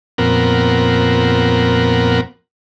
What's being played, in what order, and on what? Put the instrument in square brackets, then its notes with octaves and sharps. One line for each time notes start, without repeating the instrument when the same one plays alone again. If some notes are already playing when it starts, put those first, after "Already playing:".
[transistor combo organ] F2 A#2 B3 C4 A#4 F#5